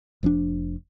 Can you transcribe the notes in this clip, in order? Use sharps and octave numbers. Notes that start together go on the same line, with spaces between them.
F1 F3 C4 D4